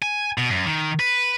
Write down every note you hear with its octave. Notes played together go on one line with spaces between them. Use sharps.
G#5
B2
F#2
D#3
B4